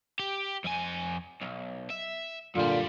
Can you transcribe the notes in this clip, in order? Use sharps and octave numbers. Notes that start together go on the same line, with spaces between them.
G4
F2 G#5
B1
E5
F#2 A#2 D3 G3 F4